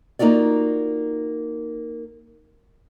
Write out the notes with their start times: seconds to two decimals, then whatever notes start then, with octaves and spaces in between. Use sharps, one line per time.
0.19 A#3 D#4 F4 F#4 D5